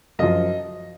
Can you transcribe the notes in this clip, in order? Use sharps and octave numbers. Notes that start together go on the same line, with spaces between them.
F#2 F3 D#5